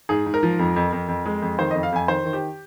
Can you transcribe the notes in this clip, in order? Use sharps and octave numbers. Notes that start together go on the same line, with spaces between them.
G#2 G#4
G#2
A#4
F3
F2
F2
F2
F2
G#3
F2
D#3 C5
F2 D#5
F5
F2 G#5
D#3 C5
D#3
G4